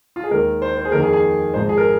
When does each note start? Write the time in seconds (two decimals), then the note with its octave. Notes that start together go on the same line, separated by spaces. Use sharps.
0.16 F4
0.24 G#4
0.31 D#2 D#3 G#3 A#4
0.62 C5
0.77 C5
0.85 G#4
0.92 F2 D#3 A#3 A#4
1.02 G#4
1.13 G#4
1.54 G#1 G#2 F3 G#3 C5
1.69 G#4
1.77 A#4